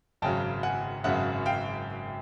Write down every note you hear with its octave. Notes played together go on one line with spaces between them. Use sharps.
G#1 F#2 C#3 F#3 G5 A5
F#5 G#5
G#1 F#2 C#3 F#3 E5 F#5
F5 G5